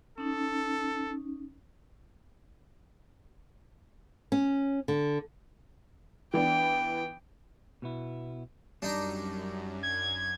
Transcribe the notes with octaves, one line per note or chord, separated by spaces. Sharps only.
C#4 D#4 A4
C#4
D3
E3 B3 D4 G5
B2 B3 E4
F#2 G3 D4 D#4 A#5
G#6